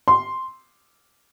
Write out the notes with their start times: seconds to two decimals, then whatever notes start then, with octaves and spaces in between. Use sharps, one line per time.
0.08 C6